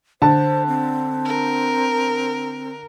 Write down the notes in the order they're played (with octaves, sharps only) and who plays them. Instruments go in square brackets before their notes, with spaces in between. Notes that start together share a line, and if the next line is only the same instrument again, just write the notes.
[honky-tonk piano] D3 [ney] C5 [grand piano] A5
[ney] C4
[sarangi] A#4